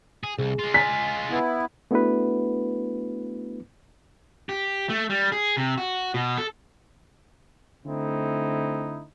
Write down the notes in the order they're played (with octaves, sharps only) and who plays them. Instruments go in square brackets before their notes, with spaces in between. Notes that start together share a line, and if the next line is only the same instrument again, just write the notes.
[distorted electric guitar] G#4
[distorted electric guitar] C2 [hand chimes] G#4
[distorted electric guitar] G#3 F4
[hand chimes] G#5 A6 [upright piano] B6
[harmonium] B3 E4
[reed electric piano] A3 B3 D4 E4 F#4 B4
[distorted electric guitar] G4
A3
G3
G#4
C3
F#4
B2
A4
[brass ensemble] D3 A3 C4 D#4 E4